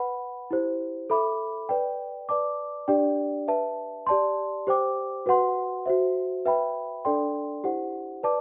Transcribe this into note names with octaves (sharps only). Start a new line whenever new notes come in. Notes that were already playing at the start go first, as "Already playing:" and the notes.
Already playing: B4 F#5 B5
E4 G4 C5
A4 E5 B5 D6
B4 D5 G5
B4 D5 A5 D6
D4 G4 D5 G5
B4 E5 A5
G4 D5 A5 C6
G4 C5 G5 D6
F#4 B4 F#5 C6
F#4 C5 E5
B4 E5 G5 B5
D4 A4 D5 G5 C6
E4 G4 C5 F#5
B4 D5 A5 D6